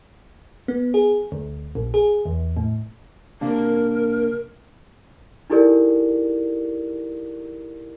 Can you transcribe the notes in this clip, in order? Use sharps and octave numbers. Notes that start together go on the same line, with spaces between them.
B3
G#4
D2
A#1
G#4
E2
A2
C3 A#3 D4 A#4
D#4 E4 G4 A4 A#4 D5